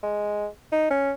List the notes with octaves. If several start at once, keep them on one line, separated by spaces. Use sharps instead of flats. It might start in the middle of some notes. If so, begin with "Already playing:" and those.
G#3
D#4
C#4